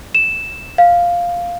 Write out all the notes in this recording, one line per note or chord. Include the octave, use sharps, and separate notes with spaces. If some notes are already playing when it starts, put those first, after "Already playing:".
E7
F5